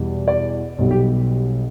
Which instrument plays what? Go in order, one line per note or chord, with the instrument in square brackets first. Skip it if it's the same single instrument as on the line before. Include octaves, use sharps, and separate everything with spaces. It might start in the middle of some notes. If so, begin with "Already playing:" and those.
Already playing: [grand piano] E2 B2 G3
D5
B1 B2 G3
G4